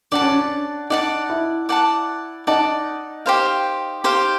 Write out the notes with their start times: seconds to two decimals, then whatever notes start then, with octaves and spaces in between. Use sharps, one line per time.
0.12 D4 D5 F#5 A5
0.21 C#4
0.32 D4
0.90 D#4 D5 F#5 A5
1.29 E4
1.69 D5 F#5 A5
2.47 D#4 D5 F#5 A5
3.26 G4 C5 F5
4.04 G4 C5 F5